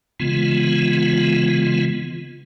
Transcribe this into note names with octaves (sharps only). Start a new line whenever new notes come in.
C#3 E3 G#3 B3 F4